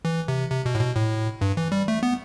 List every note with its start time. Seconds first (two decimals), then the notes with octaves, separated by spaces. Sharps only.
0.05 E3
0.28 C3
0.50 C3
0.66 B2
0.75 A2
0.81 B2
0.96 A2
1.41 G2
1.57 E3
1.72 G3
1.88 A3
2.03 B3